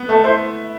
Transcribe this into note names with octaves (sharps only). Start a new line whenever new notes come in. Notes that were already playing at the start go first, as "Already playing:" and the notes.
Already playing: B3
A3 A4
E4 C5